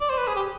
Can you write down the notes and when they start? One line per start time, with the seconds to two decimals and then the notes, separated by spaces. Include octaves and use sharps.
0.01 D5
0.10 C5
0.18 B4
0.28 G#4
0.36 G4